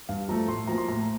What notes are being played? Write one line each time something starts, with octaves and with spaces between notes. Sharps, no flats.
G2 F5
F3 A3 A#5
A2 C6
F3 A#3 A#5
C6
A2 A#5